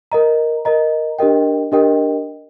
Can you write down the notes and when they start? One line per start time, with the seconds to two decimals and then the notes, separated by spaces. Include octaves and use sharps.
0.12 A#4 D#5 A#5
0.65 A#4 D#5 A#5
1.19 D4 G4 A#4 D#5 G5
1.72 D4 G4 A#4 D#5 G5